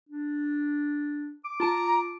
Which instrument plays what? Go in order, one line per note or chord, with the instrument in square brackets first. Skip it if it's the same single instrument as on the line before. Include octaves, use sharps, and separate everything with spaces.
[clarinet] D4
D6
[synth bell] F4 A5 D7 [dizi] A#5